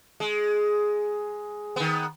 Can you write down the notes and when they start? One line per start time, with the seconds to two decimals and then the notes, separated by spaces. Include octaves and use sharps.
0.20 G#3
1.76 D#3 B3